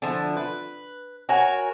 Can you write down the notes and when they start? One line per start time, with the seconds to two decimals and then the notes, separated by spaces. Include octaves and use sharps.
0.02 D3 F3 E4
0.37 B4
1.29 F#4 A#4 C#5 G#5